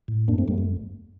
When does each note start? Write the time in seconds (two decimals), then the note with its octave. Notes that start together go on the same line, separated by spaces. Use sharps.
0.08 A2
0.28 F#2 A#3 D4
0.38 A3 C4
0.48 F#2 G3 A#3
0.58 A3